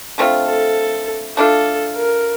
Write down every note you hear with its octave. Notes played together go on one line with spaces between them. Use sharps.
D3 A3 C4 F4
A4
A3 D4 F4 A4
A#4